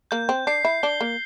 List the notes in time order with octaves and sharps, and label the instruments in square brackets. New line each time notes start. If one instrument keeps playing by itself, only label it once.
[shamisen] A#3 [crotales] G6
[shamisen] C4
[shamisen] D4 [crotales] C7
[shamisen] E4
[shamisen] D4 [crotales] G7
[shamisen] A#3